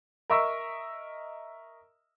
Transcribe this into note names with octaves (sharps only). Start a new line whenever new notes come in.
A#4 D#5 E5 C#6 E6